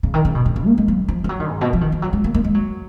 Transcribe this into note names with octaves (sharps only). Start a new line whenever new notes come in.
C#3
D#3
C#3
B2
C#3
C#3
A#3
G#3
F#3
F3
F3
F#3
D#3
G#2
B2
F3
D#3
F3
F#3
G#3
A#3
A#3
G#3
F#3